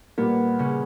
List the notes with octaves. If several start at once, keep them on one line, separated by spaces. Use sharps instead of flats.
A#2 G3 A#3 B3
C#3 C#4